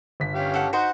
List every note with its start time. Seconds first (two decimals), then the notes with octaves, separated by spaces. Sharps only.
0.20 G1 B6
0.35 C#4 G4 F5
0.54 A4 F#5
0.73 D#4 F#4 C5 D#5 F#5